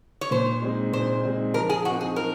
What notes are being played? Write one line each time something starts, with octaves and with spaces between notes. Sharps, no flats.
C#5
A#2 C5
G#3 C4 D#4
A#2 C5
G#3 C4 D#4
F3 A#4
G#4
C4 D#4 F#4
G#4
F3 A#4